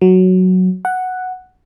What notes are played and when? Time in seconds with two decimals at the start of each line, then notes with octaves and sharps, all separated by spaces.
0.01 F#3
0.85 F#5